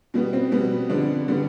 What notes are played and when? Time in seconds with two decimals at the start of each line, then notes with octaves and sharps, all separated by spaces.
0.14 B2 G3 B3
0.33 C4
0.52 B2 G3 B3
0.89 F2 D3 G3 B3 D4
1.28 D3 G3 B3